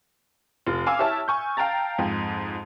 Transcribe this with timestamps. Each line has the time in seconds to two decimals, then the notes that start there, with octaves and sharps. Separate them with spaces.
0.66 F1 F4
0.86 F5 G#5 D6 E6 F6
0.99 E4 G4 C#5 E5 A5
1.28 G#5 C#6 G6
1.57 F5 G5 A5 A#5 A6
1.98 F2 G#2